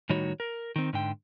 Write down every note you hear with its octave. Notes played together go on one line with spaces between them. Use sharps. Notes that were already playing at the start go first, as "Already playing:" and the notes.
A2 D#3 G3 D#4 F#4 C#5
A#4
D#3 C4
G#2 D3 G5